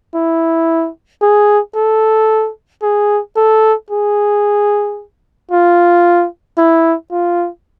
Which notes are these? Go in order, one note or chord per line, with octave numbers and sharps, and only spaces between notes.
E4
G#4
A4
G#4
A4
G#4
F4
E4
F4